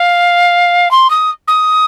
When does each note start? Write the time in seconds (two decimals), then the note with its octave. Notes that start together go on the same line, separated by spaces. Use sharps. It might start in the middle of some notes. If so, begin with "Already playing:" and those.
Already playing: F5
0.91 C6
1.10 D#6
1.47 D#6